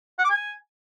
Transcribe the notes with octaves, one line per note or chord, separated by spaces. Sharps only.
F#5
D6
G#5